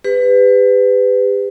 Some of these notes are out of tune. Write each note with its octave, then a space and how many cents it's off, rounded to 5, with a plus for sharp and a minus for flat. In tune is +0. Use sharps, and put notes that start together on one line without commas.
G4 +35 B4 +20